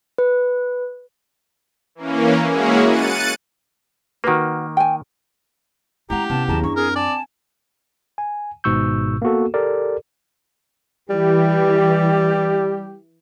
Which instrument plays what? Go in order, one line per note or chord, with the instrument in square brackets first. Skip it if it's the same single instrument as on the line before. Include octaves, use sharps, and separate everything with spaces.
[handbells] B4
[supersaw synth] E3 A#3 C#4
G#3 A#3 C#4 E4 F#4 G#4
F#6 A6 C#7 D#7
[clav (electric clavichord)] D#3 A#3 [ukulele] F#4 B4
[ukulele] G5 G#5
[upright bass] G#3 C#4 [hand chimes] E4 F#5 [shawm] G4 [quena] A#5
[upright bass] C3 [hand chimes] B3 C#4 [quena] A5
[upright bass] D#2 F#3 [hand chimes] E4 G#4 A#5 [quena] A5
[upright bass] F#2 [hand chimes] D4 [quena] C#6
[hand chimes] C4 [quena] G#4 [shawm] A#4
[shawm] D5 [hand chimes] G#5 [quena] A5
[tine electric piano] G#5
G#1 G#2 B2 C#6 E6 G6
A#3 B3 F#4 A4
G4 A4 A#4 D5
[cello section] E3 [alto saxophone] G3 [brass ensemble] G4